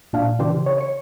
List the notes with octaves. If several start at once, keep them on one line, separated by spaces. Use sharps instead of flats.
A#2 D4 F5
C#3 E3 D4 G4 C5
C#5
C#5 C#7